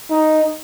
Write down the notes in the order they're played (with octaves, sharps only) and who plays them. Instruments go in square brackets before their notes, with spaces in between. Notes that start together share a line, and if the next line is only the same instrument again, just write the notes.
[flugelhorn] D#4